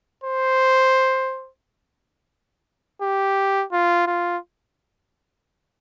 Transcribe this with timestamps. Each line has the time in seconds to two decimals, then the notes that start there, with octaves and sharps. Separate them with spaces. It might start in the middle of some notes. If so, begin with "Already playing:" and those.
0.24 C5
3.02 G4
3.72 F4
4.07 F4